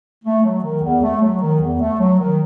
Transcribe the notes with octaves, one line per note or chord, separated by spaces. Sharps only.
A3
F#3
D#3
E2
A3
F#3
D#3
E2
A3
F#3
D#3